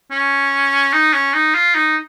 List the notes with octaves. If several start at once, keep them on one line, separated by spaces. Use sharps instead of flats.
C#4
D#4
C#4
D#4
F4
D#4